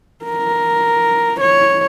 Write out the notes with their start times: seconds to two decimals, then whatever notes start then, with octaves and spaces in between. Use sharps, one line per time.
0.24 A#4
1.41 C#5